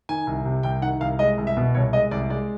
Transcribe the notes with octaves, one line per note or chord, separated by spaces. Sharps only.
D#3 G#5
C2
C3
C2 G5
D#3 F#5
C2 F5
G#3 D#5
C2
E5
B2
C2 C#5
G#3 D#5
C2 D5
G#3 D5